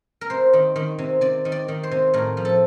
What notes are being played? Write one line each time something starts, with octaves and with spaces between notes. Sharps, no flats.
A#4
C3 C5
D#3
D#3
C3
C3 D5
D#3
D5
D#3
C5
C3
A2 A#4
F3
A4